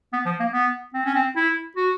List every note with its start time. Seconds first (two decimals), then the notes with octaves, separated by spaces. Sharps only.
0.13 B3
0.26 F3
0.40 A#3
0.53 B3
0.94 C4
1.05 C#4
1.15 C4
1.36 E4
1.77 F#4